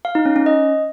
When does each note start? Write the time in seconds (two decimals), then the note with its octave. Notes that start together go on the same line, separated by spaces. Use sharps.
0.05 F5
0.15 D#4
0.25 C#4
0.36 C#4
0.46 D#5